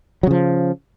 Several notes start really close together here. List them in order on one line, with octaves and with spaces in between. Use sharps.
F#3 C#3 F3